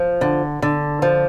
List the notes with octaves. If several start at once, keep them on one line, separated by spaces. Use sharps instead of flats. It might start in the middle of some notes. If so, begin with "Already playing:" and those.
Already playing: F3
D3
D3
F3